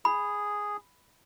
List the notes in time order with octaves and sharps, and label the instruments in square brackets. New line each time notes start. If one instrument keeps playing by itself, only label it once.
[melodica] G#4 [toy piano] B5